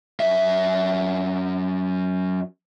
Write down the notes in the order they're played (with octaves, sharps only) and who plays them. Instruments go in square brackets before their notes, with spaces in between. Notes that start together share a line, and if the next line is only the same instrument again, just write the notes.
[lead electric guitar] F#2 E5